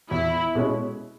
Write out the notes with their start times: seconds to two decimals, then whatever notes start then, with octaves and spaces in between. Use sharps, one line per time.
0.11 E2 E4
0.55 B2 G#3 C#4